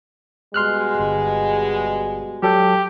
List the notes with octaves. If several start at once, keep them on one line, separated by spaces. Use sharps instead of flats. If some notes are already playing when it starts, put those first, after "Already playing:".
B2 G3 G#3 C6 F6 F#6
G1
F#3 G4 A4